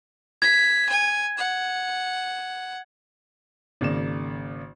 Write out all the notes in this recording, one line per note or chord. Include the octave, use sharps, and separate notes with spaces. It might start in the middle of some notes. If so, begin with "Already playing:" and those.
G#6 B6
G#5
F#5
G#1 C#3 A#3 D5 E7